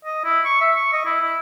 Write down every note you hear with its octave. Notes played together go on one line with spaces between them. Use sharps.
D#5
E4
C#6
E5
C#6
D#5
E4
E4